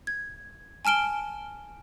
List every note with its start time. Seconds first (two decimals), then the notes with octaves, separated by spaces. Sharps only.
0.07 G#6
0.85 G#5 A5 F6 D7 G7